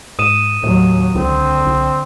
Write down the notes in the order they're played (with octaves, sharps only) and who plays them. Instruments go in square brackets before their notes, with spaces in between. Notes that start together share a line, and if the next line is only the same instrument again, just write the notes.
[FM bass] G#2 [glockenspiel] D#6 D#7 E7
[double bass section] D#2 F#3 [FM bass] A2
[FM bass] C#2 [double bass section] D3 [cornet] C4
[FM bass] C2